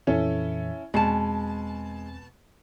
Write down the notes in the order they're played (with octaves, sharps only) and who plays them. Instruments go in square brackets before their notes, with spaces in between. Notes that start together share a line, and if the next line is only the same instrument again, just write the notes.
[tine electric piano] F2 A#2 E3 [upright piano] C#4 E4 A4
[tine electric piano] E2 C4 G#5 [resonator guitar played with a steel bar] B2 A5 [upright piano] G#3